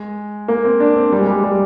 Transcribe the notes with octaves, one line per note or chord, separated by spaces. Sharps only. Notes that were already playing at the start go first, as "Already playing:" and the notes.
Already playing: G#3
A#3
C4
D4
C4
G3
G#3
G3
G3